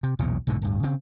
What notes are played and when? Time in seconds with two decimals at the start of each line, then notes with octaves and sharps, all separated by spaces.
0.03 C3
0.19 B1 E2 A#2 C#3
0.47 B1 G#2 B2 D3
0.62 D1 G2
0.83 C#3 C4